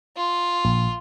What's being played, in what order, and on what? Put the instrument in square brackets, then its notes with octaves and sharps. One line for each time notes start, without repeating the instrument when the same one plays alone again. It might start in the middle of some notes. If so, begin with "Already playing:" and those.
[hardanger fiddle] F4
[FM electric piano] A#1